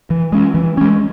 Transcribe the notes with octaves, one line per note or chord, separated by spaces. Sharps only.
E3
G#3 C#4
E3
G#3 C#4